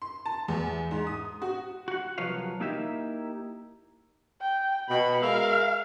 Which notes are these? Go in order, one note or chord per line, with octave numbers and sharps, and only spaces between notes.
C6
A5
E2
G#2
D#6
F#4
F#4 F#5
C2 F3 F#3 B4 C#5 F5
A#3 D#4 E4 G4 E5
G5
B2 B5
G#3 A#4 E5 F5